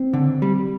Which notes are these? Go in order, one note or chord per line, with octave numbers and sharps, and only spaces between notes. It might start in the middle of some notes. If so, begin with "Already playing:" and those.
Already playing: C4
D3
G3